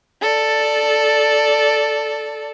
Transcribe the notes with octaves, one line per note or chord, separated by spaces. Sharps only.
A4 D5